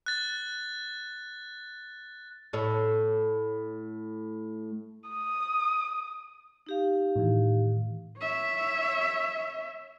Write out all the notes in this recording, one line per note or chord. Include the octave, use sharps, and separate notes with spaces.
F#6 A6
A2 A3 C#5
D#6
D#4 G4 F5
A2 D#3 E3
C#5 E5